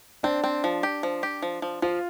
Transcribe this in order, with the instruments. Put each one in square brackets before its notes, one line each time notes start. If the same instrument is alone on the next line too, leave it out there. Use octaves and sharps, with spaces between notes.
[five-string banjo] C4 [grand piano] D4
[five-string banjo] C4
F3
G4
F3
G4
F3
F3
[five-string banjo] F3 [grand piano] F4